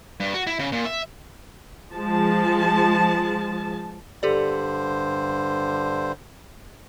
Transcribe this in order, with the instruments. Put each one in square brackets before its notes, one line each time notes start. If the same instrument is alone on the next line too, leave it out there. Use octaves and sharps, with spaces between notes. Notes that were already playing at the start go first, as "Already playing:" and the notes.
[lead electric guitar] G2
F#4
E4
C#3
A#2
E5
[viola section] F3 G#3 A5
[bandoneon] G2 D3 C5 [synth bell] G4 A4 D5